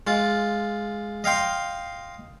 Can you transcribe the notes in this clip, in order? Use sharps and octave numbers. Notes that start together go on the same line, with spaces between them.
G#3 F4
D#5 F5 G5 C6